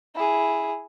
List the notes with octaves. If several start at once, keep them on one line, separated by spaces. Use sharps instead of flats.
E4 G#4